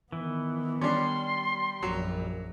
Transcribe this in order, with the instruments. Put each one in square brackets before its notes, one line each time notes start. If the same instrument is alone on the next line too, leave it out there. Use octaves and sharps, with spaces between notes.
[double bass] D#3 B3 [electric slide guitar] E3
[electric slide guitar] G3 [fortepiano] C#4 D4 [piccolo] C6
[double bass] A#1 F#2 [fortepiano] F#3